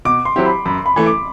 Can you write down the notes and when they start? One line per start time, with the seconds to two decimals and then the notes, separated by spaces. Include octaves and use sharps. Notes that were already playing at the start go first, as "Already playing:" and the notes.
0.05 B2 D6
0.25 C6
0.36 F#3 C4 E4 G4
0.46 B5
0.66 F#2 B5
0.86 B5
0.96 E3 A3
1.06 D6